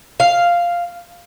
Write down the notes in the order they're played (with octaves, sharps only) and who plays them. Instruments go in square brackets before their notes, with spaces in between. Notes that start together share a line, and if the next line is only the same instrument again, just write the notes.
[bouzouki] F5